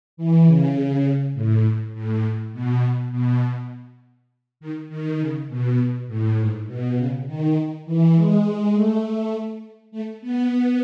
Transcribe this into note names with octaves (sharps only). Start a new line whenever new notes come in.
E3
C#3
A2
A2
B2
B2
D#3
D#3
C#3
B2
A2
G#2
B2
C#3
D#3
E3
G#3
A3
A3
B3